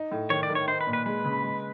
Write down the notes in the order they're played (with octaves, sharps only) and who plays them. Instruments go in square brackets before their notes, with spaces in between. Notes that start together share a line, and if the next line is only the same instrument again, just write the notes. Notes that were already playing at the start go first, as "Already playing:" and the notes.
Already playing: [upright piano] D#4
A2
[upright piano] D#3 [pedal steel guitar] C#5
[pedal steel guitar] D5
[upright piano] D#3
[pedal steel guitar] C#5
[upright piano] D#4 [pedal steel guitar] C5
[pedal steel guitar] B4
[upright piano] A#2
[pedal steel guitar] B4
[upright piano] G#3 [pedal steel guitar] B4
[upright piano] C#3
G#3